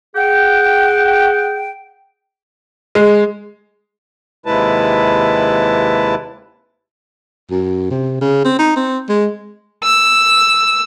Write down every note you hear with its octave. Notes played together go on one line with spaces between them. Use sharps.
G#4 F#5 G5
G#3
D#2 C3 G#3 E4 B4 A5
F#2
C3
C#3
C4
D#4
C4
G#3
E6